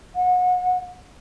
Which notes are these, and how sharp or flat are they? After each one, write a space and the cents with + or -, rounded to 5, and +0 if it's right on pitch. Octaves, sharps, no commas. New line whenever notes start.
F#5 -30